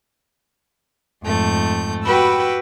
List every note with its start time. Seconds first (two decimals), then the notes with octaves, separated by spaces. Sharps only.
1.23 F2 G#2 A3 G6
2.04 F#4 G4 B4 G5 B5 E6